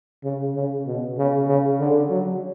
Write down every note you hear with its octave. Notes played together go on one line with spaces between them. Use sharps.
C#3
C#3
B2
C#3
C#3
D3
F#3